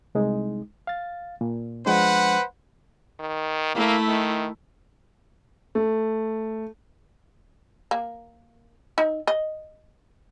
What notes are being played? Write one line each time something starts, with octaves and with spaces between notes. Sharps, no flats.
C2 G#3 D#4
F5 A6
A#2
F3 G#3 D4 B4 C5 F#5
D#3
A3 A#3 E4
D#3
A3
A#3
D#4
D#5